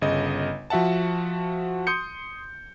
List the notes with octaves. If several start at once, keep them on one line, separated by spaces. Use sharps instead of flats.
G1 C#3 D#5
F3 F#4 E5 F#5 A5
C6 D#6 G6 C#7